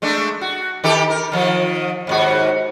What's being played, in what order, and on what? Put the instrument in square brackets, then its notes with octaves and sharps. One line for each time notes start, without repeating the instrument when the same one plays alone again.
[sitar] G#3 A3 D4
F#4
D#3 G4 A4
A#4
D#3 F3
D#2 G#2 F#4